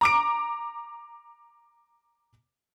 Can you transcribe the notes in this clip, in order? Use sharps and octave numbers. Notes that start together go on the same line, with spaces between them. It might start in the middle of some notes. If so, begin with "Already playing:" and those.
A#5 D6 D7